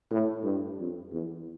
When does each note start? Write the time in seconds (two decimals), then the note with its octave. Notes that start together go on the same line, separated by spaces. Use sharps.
0.11 A2
0.44 G2
0.78 F2
1.12 E2